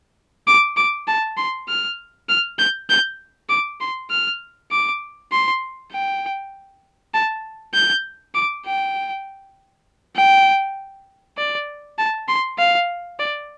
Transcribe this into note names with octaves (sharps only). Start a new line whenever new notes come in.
D6
D6
A5
C6
F6
F6
G6
G6
D6
C6
F6
D6
C6
G5
A5
G6
D6
G5
G5
D5
A5
C6
F5
D5